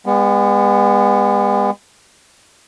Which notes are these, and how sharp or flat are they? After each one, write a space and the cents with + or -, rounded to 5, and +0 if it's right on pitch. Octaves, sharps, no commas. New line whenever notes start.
G#3 -45 B3 +0